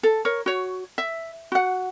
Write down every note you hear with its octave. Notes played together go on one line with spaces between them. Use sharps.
A4
A#4 C#5
F#4 C#5
E5
F#4 F#5